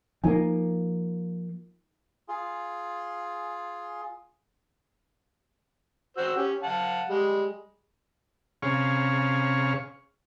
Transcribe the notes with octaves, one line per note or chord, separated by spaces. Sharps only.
F3 A#3 D#4 G#5
F4 G#4
F#4 C5 E6
C#4 G4
F5 F#5 A5
G3 G#3
C3 C#4 G#4 C#5 F5